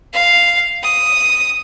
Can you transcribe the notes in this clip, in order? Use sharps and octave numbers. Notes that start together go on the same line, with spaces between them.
F5
D#6